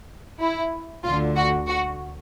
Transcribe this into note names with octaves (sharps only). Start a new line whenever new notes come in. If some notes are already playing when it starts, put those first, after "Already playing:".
E4
D2 D3 F4
F#4
F#4